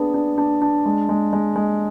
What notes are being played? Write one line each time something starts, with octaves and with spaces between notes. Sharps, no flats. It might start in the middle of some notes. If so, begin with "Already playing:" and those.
Already playing: B3 D4 G#4
D4
D4
D4
G#3
G#3
G#3
G#3